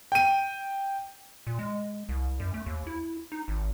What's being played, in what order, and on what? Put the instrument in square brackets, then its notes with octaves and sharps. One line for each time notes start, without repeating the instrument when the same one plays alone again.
[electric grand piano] G5 D#7
[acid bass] A#2
G#3
C2
F#2
A3
D#2
E4
D#4
G#1